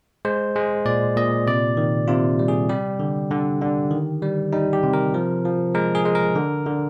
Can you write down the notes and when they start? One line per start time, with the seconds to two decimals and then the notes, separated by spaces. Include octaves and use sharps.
0.25 G#3 C5
0.56 G#3
0.85 A#2 D5
1.17 A#2 D#5
1.47 C3 D5
1.77 D#3
2.08 C3 F4
2.39 G3
2.48 G#4
2.69 G3 G4
2.99 D3
3.31 D3
3.61 D3
3.91 D#3
4.22 G3
4.53 G3 D#4
4.73 G4
4.83 C3
4.94 A#4
5.14 F3
5.45 F3
5.75 G#3 A#4
5.95 G#4
6.05 G#3
6.15 A#4
6.35 D3
6.66 D3